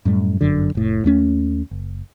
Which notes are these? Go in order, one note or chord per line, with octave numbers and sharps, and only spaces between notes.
F#2 A2 G3
G1 F#2 D3
F1 A2
D#2 A3 C#4
F#1